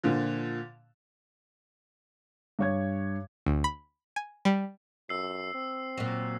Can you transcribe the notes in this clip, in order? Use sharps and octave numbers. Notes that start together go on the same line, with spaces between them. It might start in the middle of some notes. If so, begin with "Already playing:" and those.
A#2 D3 F3
G2 C#5 G#6
D2
B5
G#5
G3
F#2 E6 C7
C4
A#2 F#3